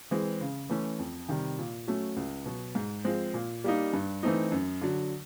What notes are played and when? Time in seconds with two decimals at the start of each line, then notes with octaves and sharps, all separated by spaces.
0.11 E3 G#3 C4
0.41 C#3
0.69 E3 A3 C#4
0.99 F2
1.29 C3 D#3 G3
1.59 A#2
1.87 F#3 A3 C#4
2.16 C#2
2.46 B2 F#3
2.75 G#2
3.05 F3 G#3 C4
3.34 A#2
3.64 G3 A#3 D#4
3.93 G2
4.23 E3 A3 C4 D#4
4.52 F#2
4.81 D3 F#3